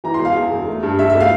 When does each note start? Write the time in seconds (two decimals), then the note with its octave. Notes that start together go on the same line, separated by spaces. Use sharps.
0.04 E3 A#5
0.14 C6
0.20 E1 F5
0.36 E2
0.51 E1
0.67 A3
0.83 G2
0.99 G2 E5
1.10 E5
1.14 A3
1.20 F5